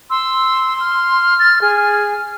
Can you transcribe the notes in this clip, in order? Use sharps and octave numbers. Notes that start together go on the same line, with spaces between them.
C6 E6
F6
A6
G#4